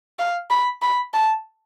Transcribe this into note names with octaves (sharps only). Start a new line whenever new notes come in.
F5
B5
B5
A5